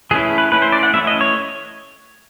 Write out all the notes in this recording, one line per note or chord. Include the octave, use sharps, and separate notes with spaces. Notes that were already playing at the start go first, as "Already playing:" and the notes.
E3 A3 C#4 E4 G#4
B4
E3 A3 C#4 E4 B4
C5
D5
F#5
E3 A3 C#4 E4 E5
D#5
C#5